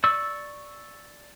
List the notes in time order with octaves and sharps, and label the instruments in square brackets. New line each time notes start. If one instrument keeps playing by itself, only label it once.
[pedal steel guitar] D5 C#6 E6